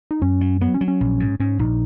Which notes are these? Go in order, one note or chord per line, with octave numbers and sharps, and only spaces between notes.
D#4
F#2 C#4
F#3
F#3 B3
C#4
F#3
C#4
A#1
G#2
G#2 C#4
A#1 D#4